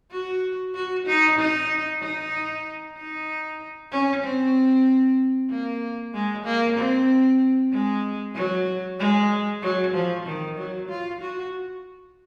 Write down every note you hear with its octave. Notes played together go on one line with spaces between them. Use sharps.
F#4
F#4
D#4
D#4
D#4
D#4
C#4
C4
A#3
G#3
A#3
C4
G#3
F#3
G#3
F#3
F3
D#3
F#3
F4
F#4